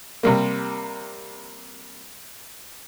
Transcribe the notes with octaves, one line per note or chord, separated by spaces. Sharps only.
C3 G3 A#3